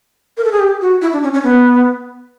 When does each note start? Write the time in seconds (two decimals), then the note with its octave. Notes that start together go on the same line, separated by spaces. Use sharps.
0.37 A#4
0.44 A4
0.52 G#4
0.60 G4
0.81 F#4
1.02 E4
1.13 D4
1.23 C#4
1.34 C#4
1.44 B3